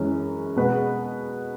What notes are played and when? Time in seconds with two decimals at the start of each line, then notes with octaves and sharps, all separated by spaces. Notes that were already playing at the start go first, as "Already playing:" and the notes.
Already playing: F#2 E3 G#3 C#4
0.56 B2 G#3 B3 B4